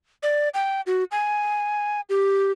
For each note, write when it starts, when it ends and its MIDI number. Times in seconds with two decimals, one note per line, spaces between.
0.23 0.49 74
0.54 0.81 79
0.87 1.04 66
1.11 2.01 80
2.09 2.52 67